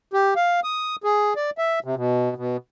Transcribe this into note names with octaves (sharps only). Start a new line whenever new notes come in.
G4
F5
D#6
G#4
D5
E5
C3
B2
B2